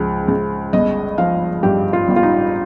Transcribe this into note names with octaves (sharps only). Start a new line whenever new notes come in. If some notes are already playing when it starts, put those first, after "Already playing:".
Already playing: C#2 F3
C#2
G1 D#5
F3 F5
G2 G4
F4
G1
F4
D#4